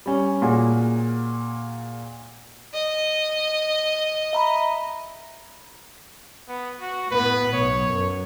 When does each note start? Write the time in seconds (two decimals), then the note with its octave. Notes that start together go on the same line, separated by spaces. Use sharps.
0.06 G3 C#4
0.42 A#2 A#3 F#4 G#4
2.74 D#5
4.33 E5 A#5 B5
6.48 B3
6.80 F#4
7.11 A2 B3 B4
7.53 B1 C#5
7.88 F#2